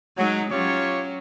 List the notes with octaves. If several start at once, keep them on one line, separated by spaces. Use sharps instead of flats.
F#3 G#3 D#4
F#3 C#4 F4 G4 C#5